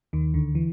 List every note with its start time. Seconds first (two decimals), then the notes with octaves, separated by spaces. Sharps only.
0.13 D#2 D#3
0.34 D2 D3
0.55 E3